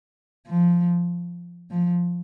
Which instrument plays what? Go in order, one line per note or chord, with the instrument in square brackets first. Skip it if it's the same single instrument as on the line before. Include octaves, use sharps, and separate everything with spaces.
[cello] F3
F3